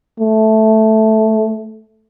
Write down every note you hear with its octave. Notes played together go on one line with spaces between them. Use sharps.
A3